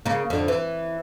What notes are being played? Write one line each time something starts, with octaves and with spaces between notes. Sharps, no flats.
C#3 A#3
F2 D3
E3